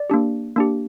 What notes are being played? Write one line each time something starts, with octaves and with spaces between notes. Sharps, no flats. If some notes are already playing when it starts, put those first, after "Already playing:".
Already playing: D5
A#3 D4 G4
A#3 D4 G4